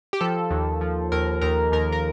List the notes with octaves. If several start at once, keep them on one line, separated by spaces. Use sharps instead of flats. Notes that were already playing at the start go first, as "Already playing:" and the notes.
G4
F3 A4
D#2
F3
D#2 A#4
D#2 A#4
D#2 A#4
A#4